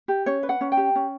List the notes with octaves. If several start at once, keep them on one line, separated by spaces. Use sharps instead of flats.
G4
C#4 C#5
B4
F#5
C#4
G5
G4
C#4